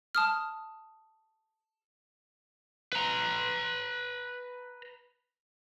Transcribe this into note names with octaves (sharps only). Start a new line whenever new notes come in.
A5 D#6 F6
B4 A#5